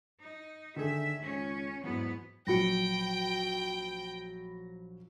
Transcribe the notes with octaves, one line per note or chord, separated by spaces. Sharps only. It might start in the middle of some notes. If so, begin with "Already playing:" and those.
D#4
D3 D#3 A3 G#4 E5
C#2 C#4
E2 G#2 F#3 B3
A#1 F#3 F#4 G5 B5 A#6 C#7